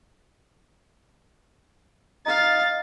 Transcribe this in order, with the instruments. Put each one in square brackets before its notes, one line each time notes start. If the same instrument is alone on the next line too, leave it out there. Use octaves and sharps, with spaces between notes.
[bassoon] D#4 [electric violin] F5 A6